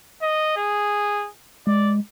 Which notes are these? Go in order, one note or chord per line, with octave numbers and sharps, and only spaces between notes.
D#5
G#4
G#3 D5